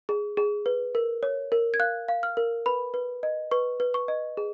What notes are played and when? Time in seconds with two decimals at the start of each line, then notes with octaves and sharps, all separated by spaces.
0.09 G#4
0.37 G#4
0.66 B4
0.95 A#4
1.23 C#5
1.52 A#4
1.74 G#6
1.80 F5 F#6
2.08 F5
2.23 F6
2.37 A#4
2.66 B4 B5
2.94 B4
3.23 D#5
3.51 B4 C#6
3.80 B4
3.94 C#6
4.08 D#5
4.37 G#4